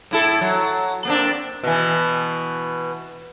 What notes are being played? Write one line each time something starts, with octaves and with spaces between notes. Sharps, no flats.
A2 E4 A4
F#3
A#3 C4 D4
B2 E3